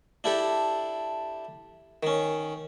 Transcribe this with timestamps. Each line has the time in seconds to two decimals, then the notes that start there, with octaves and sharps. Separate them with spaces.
0.24 D4 E4 G4 A4
2.03 D#3 C#4